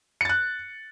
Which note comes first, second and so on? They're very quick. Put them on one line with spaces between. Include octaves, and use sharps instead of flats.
C#7 A6 F#6